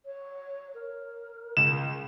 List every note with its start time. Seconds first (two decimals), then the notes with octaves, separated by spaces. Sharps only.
0.05 C#5
0.74 A#4
1.57 C#2 E7